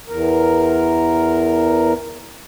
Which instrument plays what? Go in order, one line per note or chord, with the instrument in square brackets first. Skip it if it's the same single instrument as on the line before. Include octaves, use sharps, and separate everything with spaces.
[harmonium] E2 A#4